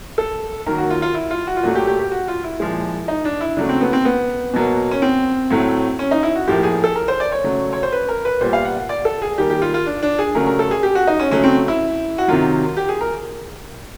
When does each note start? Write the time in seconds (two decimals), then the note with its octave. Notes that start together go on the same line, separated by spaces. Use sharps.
0.18 A4
0.66 D#3 F#3 A#3 A#4
0.78 F#4
0.90 F4
1.02 F4
1.14 E4
1.31 F4
1.47 F#4
1.57 F4
1.63 A#2 F#3 A3 F#4
1.75 G4
1.87 G4
1.99 G4
2.11 F#4
2.28 F4
2.44 E4
2.60 A#2 F3 G#3
3.08 D#4
3.25 D4
3.41 E4
3.57 C#3 F#3 A3 D4
3.69 C4
3.81 B3
3.93 C4
4.05 B3
4.53 B2 F#3 A#3
4.91 C#4
5.02 C4
5.50 A2 F#3 A3
5.99 C#4
6.11 D#4
6.23 E4
6.35 F#4
6.47 A2 F3 A#3 G4
6.63 G#4
6.84 A4
6.95 A#4
7.08 C5
7.20 D5
7.32 C#5
7.44 C#3 F#3 A3
7.73 C#5
7.83 C5
7.92 B4
8.09 A#4
8.25 B4
8.41 A#2 G3 B3 C5
8.53 F5
8.65 F#5
8.77 F#5
8.89 D5
9.05 A4
9.22 G#4
9.38 D#3 G3 A#3 G4
9.50 G4
9.62 F4
9.74 F4
9.86 D4
10.03 D4
10.19 G#4
10.35 C#3 F#3 A3 A#4
10.47 A#4
10.59 A4
10.71 G#4
10.83 G4
10.95 F#4
11.07 D#4
11.20 C#4
11.31 C#3 F#3 A3 C#4
11.44 C4
11.68 E4
12.18 F#4
12.28 C3 D#3 F#3 F4
12.77 G4
12.89 G#4
13.01 A#4